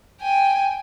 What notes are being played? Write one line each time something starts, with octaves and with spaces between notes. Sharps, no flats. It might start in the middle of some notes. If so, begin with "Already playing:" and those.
G5 G#5